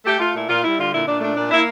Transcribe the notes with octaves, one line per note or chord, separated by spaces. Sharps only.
A3 G4
A3 F4
A#2 E4
A#2 F4
G3 E4
D3 F4
A#2 E4
A#2 D4
A3 D4
A#2 D4
A#3 E4